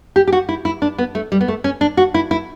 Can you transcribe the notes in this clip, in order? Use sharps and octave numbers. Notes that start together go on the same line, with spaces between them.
G4
G4
F#4
E4
E4
D4
B3
A3
G3
B3
A3
C#4
D4
F#4
E4
E4